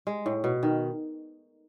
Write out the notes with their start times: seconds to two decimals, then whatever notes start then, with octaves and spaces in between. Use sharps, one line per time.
0.07 G#3
0.26 A2
0.44 B2
0.63 D#3